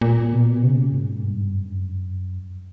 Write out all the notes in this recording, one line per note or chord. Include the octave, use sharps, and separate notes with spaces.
A#2
B2
C#3
G#2
G2
F#2